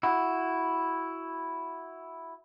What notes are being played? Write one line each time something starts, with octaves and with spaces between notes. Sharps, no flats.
E4 F#4